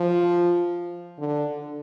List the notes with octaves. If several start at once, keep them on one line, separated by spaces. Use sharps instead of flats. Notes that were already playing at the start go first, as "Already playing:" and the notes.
Already playing: F3
D3